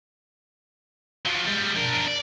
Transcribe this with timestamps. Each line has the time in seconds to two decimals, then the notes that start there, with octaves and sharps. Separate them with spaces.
1.25 F3 F#3
1.46 G3 G#3
1.77 D4 A#4
2.08 D5